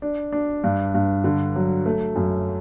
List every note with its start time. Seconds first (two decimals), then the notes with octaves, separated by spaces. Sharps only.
0.02 D4
0.32 D4
0.64 G2
0.94 G2
1.24 D3
1.56 F#3
1.86 A3
2.16 F#2